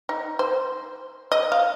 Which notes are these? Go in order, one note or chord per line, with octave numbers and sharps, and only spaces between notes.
D#4
C5
D#5
F5